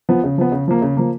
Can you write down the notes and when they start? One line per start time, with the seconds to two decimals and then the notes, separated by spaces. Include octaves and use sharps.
0.09 F3 B3
0.23 C#3
0.38 F3 B3
0.52 C#3
0.68 F3 A#3
0.82 C#3
0.97 F3 A#3